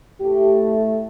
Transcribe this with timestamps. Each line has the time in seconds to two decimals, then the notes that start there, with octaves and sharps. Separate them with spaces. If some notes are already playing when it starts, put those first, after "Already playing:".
0.20 A2 A3 G4